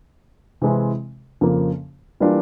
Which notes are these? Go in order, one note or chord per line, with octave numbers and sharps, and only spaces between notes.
C3 E3 G#3 C4 E4
F2 C#3 F3 A#3
E3 G3 A#3 D4 F4